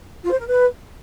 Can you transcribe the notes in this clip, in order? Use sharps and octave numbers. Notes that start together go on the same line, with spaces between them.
F4
C5
A#4
B4